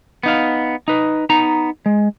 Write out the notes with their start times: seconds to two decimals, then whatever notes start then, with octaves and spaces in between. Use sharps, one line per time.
0.23 B3 D#4 F5
0.88 D#4 B4
1.29 B3 D#4 A#5
1.86 G#3